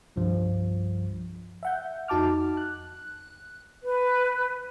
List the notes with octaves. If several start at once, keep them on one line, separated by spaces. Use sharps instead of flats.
C2 G2 F3
E5 F#5 G6
F2 D#4 F#4 A5 D6 F6
F#6
B4